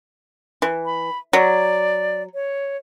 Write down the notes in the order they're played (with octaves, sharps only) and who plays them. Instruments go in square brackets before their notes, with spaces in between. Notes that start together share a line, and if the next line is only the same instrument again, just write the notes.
[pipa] E3
[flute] B5
[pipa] F#3 [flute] D5
[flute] C#5